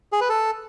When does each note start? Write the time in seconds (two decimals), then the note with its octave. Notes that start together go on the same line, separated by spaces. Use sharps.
0.12 G#4
0.21 B4
0.29 A4